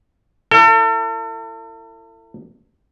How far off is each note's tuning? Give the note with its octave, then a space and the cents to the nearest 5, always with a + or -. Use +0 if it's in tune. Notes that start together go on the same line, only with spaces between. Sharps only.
E4 +25 A4 +40